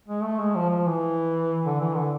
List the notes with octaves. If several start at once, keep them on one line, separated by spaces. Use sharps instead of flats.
G#3
A3
G#3
F3
F3
E3
D3
E3
D3